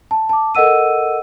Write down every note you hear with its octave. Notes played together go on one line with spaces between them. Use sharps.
A5
A5 D6
A4 A#4 D#5 F#5 E6 D#7